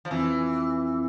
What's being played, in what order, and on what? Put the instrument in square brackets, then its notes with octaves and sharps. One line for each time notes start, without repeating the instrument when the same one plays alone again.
[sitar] F3
[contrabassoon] F2 [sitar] E3